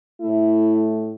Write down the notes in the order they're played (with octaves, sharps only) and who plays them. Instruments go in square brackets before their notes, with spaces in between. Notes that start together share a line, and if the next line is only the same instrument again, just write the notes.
[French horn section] A2 A3 E4